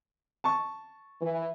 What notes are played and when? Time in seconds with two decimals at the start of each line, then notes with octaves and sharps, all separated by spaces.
0.44 A5 C#6
1.21 E3